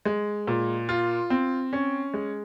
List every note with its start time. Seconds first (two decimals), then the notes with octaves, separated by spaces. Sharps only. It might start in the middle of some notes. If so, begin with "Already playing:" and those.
0.05 G#3
0.48 A#2
0.89 F4
1.30 C4
1.73 C#4
2.14 G#3